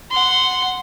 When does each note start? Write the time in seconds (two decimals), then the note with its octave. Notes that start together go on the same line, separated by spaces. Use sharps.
0.11 F#5 C6